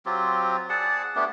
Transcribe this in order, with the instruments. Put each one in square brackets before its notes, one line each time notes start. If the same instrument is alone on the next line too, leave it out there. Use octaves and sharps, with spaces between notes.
[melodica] F#3 C4 F4 G4
G#4 D5 F#5 A5
A3 B3 D4 G4